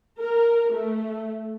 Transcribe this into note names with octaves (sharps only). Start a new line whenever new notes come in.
A#4
A3